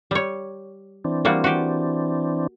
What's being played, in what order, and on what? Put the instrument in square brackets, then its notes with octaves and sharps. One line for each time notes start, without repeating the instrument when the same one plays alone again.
[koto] G3 C#5
[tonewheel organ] E3 C4 D4
[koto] G3 A#3 F#4
F#4 G4